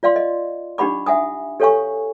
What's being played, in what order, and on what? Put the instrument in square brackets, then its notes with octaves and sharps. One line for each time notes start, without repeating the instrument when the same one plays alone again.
[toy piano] F4 D5 F5 C6
D#5
D4 D#4 G4 F#5 B5 D6
E5 F#5 G#5 D#6
G4 A4 C#5 F5 G#5 C#6